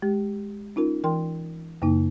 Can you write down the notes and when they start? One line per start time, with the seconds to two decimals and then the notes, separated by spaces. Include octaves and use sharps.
0.02 G#3 G4
0.76 C#4 D#4 F4 A#4
1.04 E3 A#4 G5 C6
1.82 F#2 C#3 A#3 D#4